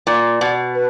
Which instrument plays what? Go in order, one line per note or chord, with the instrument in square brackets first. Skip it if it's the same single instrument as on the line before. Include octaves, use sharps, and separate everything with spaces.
[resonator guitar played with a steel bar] A#2 [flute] D5
[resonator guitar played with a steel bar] B2
[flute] B4